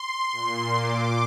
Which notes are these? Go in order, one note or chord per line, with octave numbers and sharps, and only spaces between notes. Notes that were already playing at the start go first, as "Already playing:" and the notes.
Already playing: C6
A#2
D6